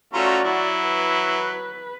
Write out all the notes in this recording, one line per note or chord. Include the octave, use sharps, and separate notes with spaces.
A3 C#4 F4 F#4 D5 A#5
F#3 E4
B4